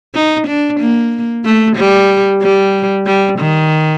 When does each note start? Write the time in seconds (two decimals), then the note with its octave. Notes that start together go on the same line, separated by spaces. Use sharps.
0.15 D#4
0.48 D4
0.80 A#3
1.45 A3
1.77 G3
2.42 G3
3.07 G3
3.40 D#3